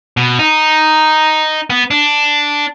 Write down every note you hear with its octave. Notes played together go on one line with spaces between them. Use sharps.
B2
D#4
B3
D4